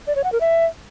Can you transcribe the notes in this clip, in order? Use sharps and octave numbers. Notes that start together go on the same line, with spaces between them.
D5
C#5
F#5
A#4
E5